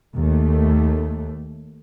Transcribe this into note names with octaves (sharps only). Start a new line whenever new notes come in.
D#2 A3